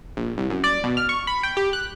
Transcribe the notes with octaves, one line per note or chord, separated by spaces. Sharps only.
A#1
C2
F#2
D5
B2
F6
C#6
B5
G5
G4
F#6